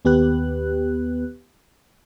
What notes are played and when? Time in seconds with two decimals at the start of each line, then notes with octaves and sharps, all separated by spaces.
0.05 D#2 B3 G4 B4 F#6